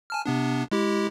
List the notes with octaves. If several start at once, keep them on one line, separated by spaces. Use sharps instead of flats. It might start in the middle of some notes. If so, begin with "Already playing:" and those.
G#5 A5 F6
C3 B3 D4
G#3 E4 G4